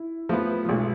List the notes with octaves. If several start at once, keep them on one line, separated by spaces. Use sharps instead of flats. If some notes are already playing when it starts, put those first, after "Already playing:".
Already playing: E4
F3 A3 B3
F3
B1 G#3